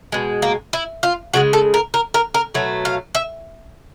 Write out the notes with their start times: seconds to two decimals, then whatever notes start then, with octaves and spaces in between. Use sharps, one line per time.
0.12 B2 G#3
0.42 A#3
0.73 E4
1.03 F4
1.34 C#3 F3 G#3 F#4
1.53 A4
1.74 A#4
1.94 A#4
2.14 A#4
2.34 A#4
2.54 B2 F#3 A3
2.85 F5
3.15 E5